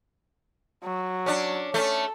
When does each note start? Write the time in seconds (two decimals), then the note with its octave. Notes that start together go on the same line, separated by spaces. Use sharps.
0.84 F#3
1.26 C#4 D4
1.74 A3 C#4 A4